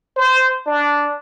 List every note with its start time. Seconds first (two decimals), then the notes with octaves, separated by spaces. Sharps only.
0.17 C5
0.66 D4